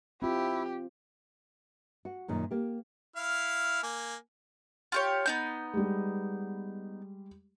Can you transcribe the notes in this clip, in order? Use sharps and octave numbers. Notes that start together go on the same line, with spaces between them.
C4 E4 F4 G4
F#4
F#2 A#2 D#3
A#3 G4
E4 F5 F6
A#3 G#5
F4 G4 C#5
B3 D#4 G6
G3 G#3